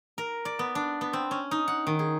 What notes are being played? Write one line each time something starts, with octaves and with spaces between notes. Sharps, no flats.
A#4
D5
B3
D4
B3
C4
C#4
D#4
F#5
D#3
G#4